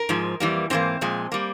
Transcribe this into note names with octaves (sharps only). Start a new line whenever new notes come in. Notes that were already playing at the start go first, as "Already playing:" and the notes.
Already playing: A#4
G#2 F3 G#3
F2 E3 G3 A#3
G#2 E3 A#3 C4 C5
A#2 F3 G#3
G3 A#3